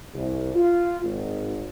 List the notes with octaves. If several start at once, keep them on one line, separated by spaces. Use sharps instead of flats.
C2
F4
G#1